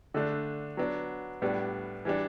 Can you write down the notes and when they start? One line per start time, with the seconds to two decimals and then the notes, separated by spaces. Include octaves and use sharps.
0.14 D3 A3 D4
0.77 F#3 B3 D4
1.42 A2 G3 B3 D4
2.05 E3 G3 D4